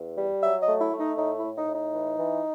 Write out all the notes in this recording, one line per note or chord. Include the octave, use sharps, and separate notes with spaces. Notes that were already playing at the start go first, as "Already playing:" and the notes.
Already playing: E2
G3
F#3 E5
D#5
A3
E4
A3
D#4
A2 D#4
E4
A2
D#4
A2
D#4
E3
E3